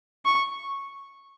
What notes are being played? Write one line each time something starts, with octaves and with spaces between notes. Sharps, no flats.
C#6